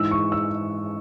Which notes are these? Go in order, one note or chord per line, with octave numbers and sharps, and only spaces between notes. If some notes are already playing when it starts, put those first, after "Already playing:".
Already playing: G#2 E3 E6
C#6
E6